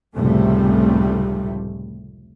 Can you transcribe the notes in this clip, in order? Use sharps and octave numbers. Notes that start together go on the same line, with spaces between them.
F1 C#2 A2 C3 G3 A3